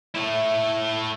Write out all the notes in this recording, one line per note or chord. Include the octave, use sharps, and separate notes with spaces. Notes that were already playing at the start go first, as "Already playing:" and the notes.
A3 E4